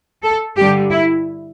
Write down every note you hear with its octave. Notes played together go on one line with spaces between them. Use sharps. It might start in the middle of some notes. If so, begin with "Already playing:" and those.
A4
G2 D3 G3 G4
E4